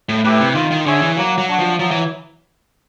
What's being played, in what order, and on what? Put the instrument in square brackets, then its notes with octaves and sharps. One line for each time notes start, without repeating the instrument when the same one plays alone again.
[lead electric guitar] A2
[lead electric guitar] A2 [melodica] E4 G4 B4
[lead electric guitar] C3
[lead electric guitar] D#3 [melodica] F4
[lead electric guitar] D#3
[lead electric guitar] D3 [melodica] G#4 C#5 E5
[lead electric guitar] E3
[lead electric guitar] F#3 [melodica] A#3
[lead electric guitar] F#3
[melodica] D4 F#4
[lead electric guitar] F3
[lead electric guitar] F3 [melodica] F#3
[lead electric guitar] E3